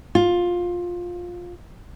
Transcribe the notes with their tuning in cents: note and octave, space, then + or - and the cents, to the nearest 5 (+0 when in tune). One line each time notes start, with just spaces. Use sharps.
F4 +15